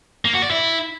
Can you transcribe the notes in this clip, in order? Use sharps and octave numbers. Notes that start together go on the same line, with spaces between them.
A#3
F#4
D5
E4